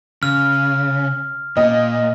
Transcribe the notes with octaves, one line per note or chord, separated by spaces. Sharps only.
C#3 F6
A#2 D#5